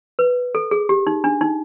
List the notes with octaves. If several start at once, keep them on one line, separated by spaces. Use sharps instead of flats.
B4
A4
G#4
G4
D#4
D4
D#4